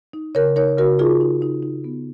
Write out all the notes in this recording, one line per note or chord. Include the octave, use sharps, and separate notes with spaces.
D#4
C#3 A#4 C#5
D#4 A#4 C#5
C#3 F#4 A#4
D#4 F4 G#4
D#4
D#4
D#4
B3